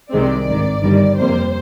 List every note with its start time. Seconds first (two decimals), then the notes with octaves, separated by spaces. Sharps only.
0.10 C2 C3 D#3 G#3 C4 D5
0.46 G#1 G2 D#3
0.81 G1 G2 D#3 G3
1.17 F2 C3 G3 A#3 C5